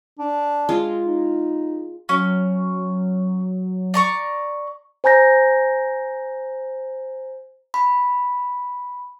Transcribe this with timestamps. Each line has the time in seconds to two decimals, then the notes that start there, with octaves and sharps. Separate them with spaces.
0.19 D4
0.69 G#3 F4
1.05 D#4
2.09 F#3 C#4
3.94 D5 A#5 C#6
5.04 C5 G#5 A#5 G6 A#6
7.74 B5